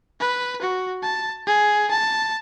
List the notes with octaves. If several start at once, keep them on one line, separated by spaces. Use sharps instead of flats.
B4
F#4
A5
G#4
A5